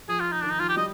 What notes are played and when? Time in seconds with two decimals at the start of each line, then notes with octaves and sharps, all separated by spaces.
0.08 F3 G#4
0.20 F4
0.32 D#4
0.43 D#3 D4
0.52 D#4
0.60 F3 F4
0.69 G4
0.77 G3 D#5